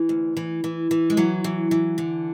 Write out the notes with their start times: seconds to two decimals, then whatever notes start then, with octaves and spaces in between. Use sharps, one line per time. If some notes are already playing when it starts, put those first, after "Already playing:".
Already playing: E3
0.09 D2
0.37 E3
0.64 E3
0.91 E3
1.10 G#3
1.17 E3 F#3
1.44 E3
1.71 E3
1.98 D3